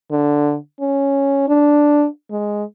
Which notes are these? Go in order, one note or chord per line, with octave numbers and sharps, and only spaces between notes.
D3
C#4
D4
G#3